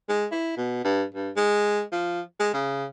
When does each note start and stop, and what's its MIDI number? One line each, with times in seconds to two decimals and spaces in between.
0.09 0.26 56
0.32 0.54 64
0.57 0.81 47
0.84 1.03 43
1.15 1.30 43
1.36 1.82 56
1.92 2.21 53
2.40 2.53 56
2.54 2.85 49